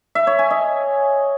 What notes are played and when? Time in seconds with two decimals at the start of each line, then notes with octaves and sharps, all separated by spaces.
0.15 E5
0.27 C#5
0.39 G#5
0.51 D#5